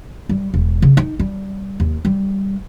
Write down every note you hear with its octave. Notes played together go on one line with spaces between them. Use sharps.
G3
E1
C#3
D#4
G3
D#2
G3